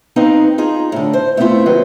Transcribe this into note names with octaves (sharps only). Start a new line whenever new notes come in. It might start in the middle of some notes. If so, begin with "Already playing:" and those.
B3 C4 D#4 B4 F5
D#4 F4 G#4
A2 D3
C5
A3 B3 C4 D4 E4 F4
D#2 F#3 B4 C5